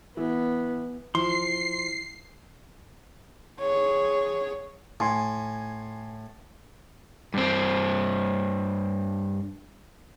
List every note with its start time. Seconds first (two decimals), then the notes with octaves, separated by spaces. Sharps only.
0.17 E3 B3
1.15 F3 E4 C6 C7
3.60 G#4 C#5
5.00 A2 G#5 C6
7.34 G2 C4